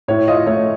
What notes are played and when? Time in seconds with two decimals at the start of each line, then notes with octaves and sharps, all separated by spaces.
0.08 A2 C#5
0.28 F4 D#5
0.46 A3 C#5